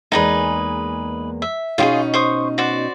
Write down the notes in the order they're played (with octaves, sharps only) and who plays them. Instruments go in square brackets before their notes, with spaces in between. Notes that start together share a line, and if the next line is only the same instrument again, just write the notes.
[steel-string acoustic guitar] E2 G#3 A#3 [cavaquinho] D#4 G#4 B4
[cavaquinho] E5
[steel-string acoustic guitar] B2 C#4 D#4 [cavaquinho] F4 G4 G#4
[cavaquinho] C5 C#6 D#6
F#4 C5 D5